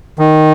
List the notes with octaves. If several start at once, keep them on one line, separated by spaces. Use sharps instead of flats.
D#3